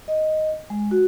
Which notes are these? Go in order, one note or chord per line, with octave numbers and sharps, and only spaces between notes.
D#5
G#3
F#4